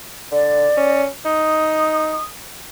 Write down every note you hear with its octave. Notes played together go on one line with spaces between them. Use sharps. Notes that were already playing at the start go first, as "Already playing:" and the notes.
D3 D5
C#4
D#4 D#6